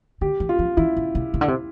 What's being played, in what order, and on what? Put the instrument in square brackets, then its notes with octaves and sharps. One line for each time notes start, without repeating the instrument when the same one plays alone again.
[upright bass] D3 [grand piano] G4
[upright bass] E3
[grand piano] F4
[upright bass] F3
[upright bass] E3 [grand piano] E4
[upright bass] D3
C3
C3
D3
C3